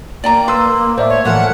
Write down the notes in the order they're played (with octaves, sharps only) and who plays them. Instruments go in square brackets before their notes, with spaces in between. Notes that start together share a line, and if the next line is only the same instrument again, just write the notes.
[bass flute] A#3 [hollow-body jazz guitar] D5 G5 A#5
[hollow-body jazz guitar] B4 [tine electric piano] C6 E6
[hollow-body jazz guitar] A2 [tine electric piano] C5 D5 E5
[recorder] C#5
[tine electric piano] A2 [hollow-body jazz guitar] E3 F3 A3 [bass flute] A#4 [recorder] F#5